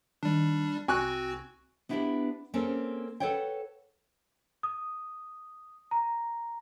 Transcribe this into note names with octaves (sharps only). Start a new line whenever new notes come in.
D#3 G3 D4
C2 C4 F#4 G#5 C#6 F#6
B3 D4 E4 F4 G4 B4
A#3 C4 C#4 G#4 A4
A4 B4 C#5 F#5 G5
D#6
A#5